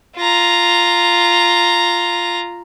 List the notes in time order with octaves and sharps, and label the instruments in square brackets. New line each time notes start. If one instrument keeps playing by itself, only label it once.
[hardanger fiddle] F4 A#5